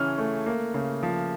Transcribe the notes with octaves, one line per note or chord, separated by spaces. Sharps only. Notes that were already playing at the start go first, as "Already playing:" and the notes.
Already playing: C#3 E3 C#4 F6
A3
A#3
C#3
F3